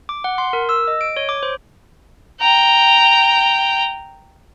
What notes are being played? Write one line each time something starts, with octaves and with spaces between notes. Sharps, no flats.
D6
F#5
C6
A#4
E6
D#5
D7
C#5
D6
C5
G5 A#5